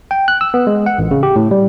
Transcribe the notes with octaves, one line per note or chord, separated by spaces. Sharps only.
G5
F#6
E6
B3
G#3
F#5
A1
C#3
G4
A2
G3